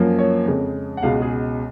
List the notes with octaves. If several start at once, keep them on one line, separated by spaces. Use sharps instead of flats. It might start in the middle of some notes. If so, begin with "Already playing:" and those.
Already playing: F#2 F3 A#3
C#5
F2 C#3 G#3
F#5
C#2 B2 G#3 F5
G#4